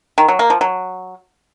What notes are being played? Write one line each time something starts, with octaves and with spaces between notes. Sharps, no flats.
D#3
F#3
A#3
F3
F#3